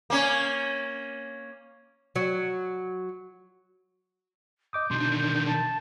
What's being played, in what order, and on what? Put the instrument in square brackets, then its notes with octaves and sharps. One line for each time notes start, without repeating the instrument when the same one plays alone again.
[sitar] A#3 C#4
[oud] F#3
[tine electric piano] D#5 D6 D#6 [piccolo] G6
[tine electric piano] B2 C6 [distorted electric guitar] D3 D#3
[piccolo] A5